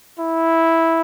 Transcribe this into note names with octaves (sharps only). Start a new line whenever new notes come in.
E4